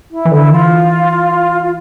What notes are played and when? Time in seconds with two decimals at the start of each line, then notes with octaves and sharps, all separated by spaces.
0.12 E4
0.25 E3
0.31 D3 E4
0.51 E3 F4
1.63 F4